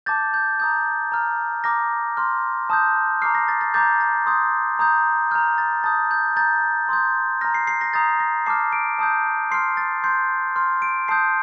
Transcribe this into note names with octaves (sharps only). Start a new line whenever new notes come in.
A5 D6 G6 A6
G6
A#5 D#6 G6
A#5 F6
A#5 D6 F6 A#6
C6 F6
A5 D#6 G6
A#5 D6 F6 C7
A#6
A6
A6
A#5 D6 G6 A6
A6
C6 D#6 G6
A#5 D#6 G6
A#5 F6 G6
A6
A5 D#6 G6 A6
G6
A#5 D#6 G6 A6
C6 D#6 G6
A#5 F6 A#6
C7
C7
A#6
A#5 D#6 G6 A6
A#6
A5 D6 F6 C7
D7
A5 D#6 G6
C6 F6 C7
A6
C6 G6 C7
C6 F6
D7
A5 D#6 G6 C7